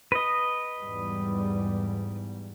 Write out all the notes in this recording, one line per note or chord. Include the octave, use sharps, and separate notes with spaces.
B4 D#5
E2 G#2 G3